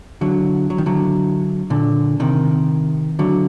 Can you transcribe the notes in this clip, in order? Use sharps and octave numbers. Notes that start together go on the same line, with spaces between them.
D3 F#3
F#3
D#3
D3 F#3
A#2 D3
C3 D#3
D3 F#3